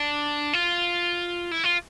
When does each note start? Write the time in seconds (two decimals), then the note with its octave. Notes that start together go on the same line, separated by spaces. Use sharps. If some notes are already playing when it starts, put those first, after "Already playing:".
Already playing: D4
0.53 F4
1.51 E4
1.64 F4